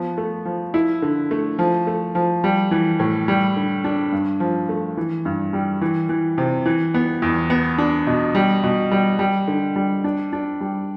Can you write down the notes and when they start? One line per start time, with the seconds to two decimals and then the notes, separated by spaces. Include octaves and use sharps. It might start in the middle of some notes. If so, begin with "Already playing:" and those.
Already playing: F3 B3
0.18 A3
0.45 F3
0.74 E4
1.02 D3
1.31 A3
1.59 F3
1.87 A3
2.15 F3
2.44 G3
2.71 E3
3.00 A2
3.28 G3
3.56 D3
3.84 D4
4.12 G2
4.40 F3
4.69 A3
4.97 E3
5.25 G2
5.53 G3
5.81 E3
6.09 E3
6.38 C3
6.66 E3
6.94 B3
7.22 E2
7.50 B3
7.78 D4
8.07 B2
8.35 G3
8.64 B2
8.91 G3
9.19 G3
9.48 D3
9.76 G3
10.04 D4
10.33 D4
10.61 G3